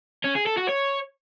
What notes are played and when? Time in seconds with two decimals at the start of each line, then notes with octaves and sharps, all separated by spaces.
0.24 C#4
0.35 G#4
0.47 A4
0.58 F#4
0.69 C#5